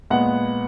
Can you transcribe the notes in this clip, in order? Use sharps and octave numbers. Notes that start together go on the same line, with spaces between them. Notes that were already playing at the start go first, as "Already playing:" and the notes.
A#2 G#3 B3 F#5